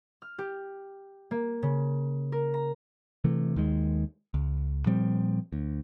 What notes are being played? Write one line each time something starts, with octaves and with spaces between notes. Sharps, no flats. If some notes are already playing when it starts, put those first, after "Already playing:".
F6
G4
A#3
C#3
A#4
A#5
C3 E3 A3
D#2 D#3 G#3
C#2
A#2 F3 G3 C4
D2